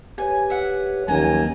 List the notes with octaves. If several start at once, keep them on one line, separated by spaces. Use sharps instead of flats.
G4 B4 C#5 G#5
E5 F#5
D#2 F3 F#3 C#4 G#5 A#5